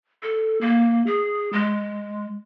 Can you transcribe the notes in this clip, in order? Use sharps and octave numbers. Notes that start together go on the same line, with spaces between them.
A4
A#3
G#4
G#3